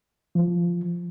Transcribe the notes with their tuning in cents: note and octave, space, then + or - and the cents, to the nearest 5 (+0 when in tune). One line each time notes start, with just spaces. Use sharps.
F3 -10